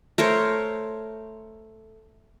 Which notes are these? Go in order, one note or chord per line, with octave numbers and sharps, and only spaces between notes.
A3 A#4 C5 C#5